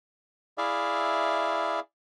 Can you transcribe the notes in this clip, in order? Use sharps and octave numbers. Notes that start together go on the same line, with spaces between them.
E4 G#4 D5 E5 F5